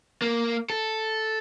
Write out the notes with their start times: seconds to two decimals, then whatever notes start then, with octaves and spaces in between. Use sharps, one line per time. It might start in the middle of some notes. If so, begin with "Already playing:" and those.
0.22 A#3
0.70 A4